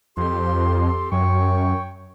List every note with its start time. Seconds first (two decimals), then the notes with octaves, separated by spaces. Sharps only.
0.17 F2 G4 A4 C6
1.12 F#2 C#5 G5 C#6